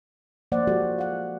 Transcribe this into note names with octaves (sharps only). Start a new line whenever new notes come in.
F3 A#3 C5 D5 F#5
F3 G#3 A#3 F#4 G4 A4
F5 F#5